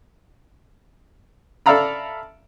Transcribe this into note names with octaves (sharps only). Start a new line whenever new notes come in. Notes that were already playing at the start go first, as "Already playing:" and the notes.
A4 D5 E5 F5 A#5 B5